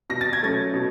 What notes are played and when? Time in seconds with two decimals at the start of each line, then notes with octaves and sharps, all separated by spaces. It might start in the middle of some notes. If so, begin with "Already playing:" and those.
0.10 B2 A#6
0.21 A6
0.33 G#6
0.41 F#3 A3 C#4 A6
0.74 B2